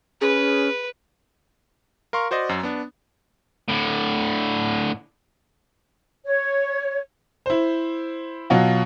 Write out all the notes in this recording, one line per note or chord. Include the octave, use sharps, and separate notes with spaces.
C#4 G#4 B4
A#4 F5 C6 C#6
F#4 C5 D5 D#5
F#2 F#3
B3 D4
A2 D3
C#5
E4 C5
B2 F#3 F4